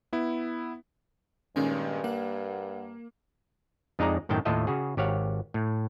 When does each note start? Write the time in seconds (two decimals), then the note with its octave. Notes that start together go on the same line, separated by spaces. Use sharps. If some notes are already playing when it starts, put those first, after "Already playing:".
0.13 B3 E4
1.56 G2 A#2 D#3 G#3 C#4 G#5
2.04 A#3 F#5
3.99 F2 G#3 D#4 G#4 D5 A#5
4.29 F#2 A2 D#3 G5 A5
4.45 D#2 A2 F4 A4 D#5 E5
4.67 C#3 F#4 G#4
4.97 G#1 G4 C#5 F5 F#5
5.54 A2